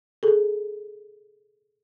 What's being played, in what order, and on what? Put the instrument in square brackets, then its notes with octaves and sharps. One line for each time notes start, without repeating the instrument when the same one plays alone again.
[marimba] G#4 A4